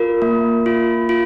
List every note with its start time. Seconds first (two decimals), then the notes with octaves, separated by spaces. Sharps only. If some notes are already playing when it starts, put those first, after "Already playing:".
Already playing: F4 A#4
0.22 A#3
0.66 F4
1.09 F4